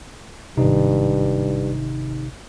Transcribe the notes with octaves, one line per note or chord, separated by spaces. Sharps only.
G#1 G2 C3 D#4